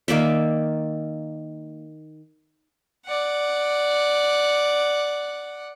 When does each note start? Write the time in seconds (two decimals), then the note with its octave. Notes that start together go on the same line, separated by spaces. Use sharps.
0.08 D#3 A#3 D5 E5
3.06 D5 F#5